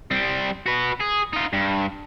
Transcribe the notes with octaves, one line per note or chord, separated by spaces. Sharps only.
G3 C4
F#4 B4
G#4
D#4 F4
G2